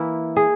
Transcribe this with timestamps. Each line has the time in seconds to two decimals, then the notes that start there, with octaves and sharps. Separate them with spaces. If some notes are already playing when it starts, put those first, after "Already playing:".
Already playing: E3 A#3 E4
0.37 G#4